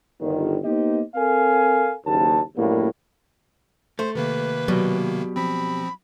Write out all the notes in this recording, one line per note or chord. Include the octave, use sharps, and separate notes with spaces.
G1 D#3
A#3 B3 D#4 G4 C5 D#5
C4 A4 A#4 F5 G#5
F#1 D#2 A5
A#1 F#2 A2 G3 A#3
A3 C5 C6
C3 D#3 A#3 B4
B2 F#3 G3
F3 C4 B5